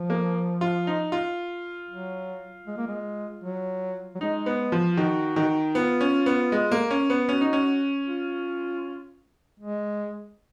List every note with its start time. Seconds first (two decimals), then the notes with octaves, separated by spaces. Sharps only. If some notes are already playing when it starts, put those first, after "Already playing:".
Already playing: F3
0.10 A#3
0.61 F4
0.87 D#4
1.12 F4
1.89 F#3
2.67 G#3
2.77 A#3
2.87 G#3
3.44 F#3
4.15 F#3
4.20 G#3 D#4
4.46 B3
4.72 F3
4.92 F4
4.97 D#3 F#4
5.36 D#3
5.75 B3 F4
6.01 C#4
6.26 B3
6.52 G#3
6.72 A#3
6.91 C#4
7.10 B3
7.29 C#4 F#4
7.41 D#4
7.53 C#4
8.05 F4
9.60 G#3